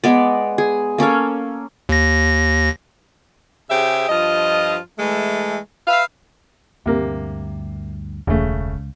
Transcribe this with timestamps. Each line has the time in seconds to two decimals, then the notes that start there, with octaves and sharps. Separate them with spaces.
0.04 G#3 B3 D5
0.58 G#4
0.98 A#3 C#4 A4 F5
1.89 D#2 A#6
3.70 C#3 G4 G#4 C5 E5
4.08 G2 F3 F4 D#5
4.99 E3 G#3 A3
5.87 B4 E5 F5
6.86 D2 G2 C3 A#3
8.27 E1 C#2 C#3 A3